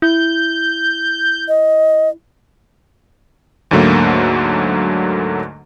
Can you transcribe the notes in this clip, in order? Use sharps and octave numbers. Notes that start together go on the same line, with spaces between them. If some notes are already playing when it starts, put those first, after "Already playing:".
E4 G6
D#5
D2 G#2 D3 F#3 A3 A#3